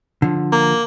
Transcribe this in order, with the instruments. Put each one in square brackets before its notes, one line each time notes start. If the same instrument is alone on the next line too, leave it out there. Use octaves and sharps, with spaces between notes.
[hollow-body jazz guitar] D3 F3
[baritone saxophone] A#3